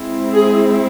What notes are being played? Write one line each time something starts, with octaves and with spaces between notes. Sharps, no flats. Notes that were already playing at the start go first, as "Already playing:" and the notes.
Already playing: G#3 C4 E4
G#4